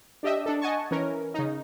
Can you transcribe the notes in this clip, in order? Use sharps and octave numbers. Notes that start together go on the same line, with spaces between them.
D4 G4 D#5 E5
D4 A4
D#5 F#5 G#5 A5 C#6
E3 C#4 A#4
C#3 D#4